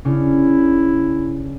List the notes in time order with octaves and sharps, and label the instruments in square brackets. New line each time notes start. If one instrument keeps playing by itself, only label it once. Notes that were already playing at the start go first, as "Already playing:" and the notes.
[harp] C#3 C#4 D4 [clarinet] E4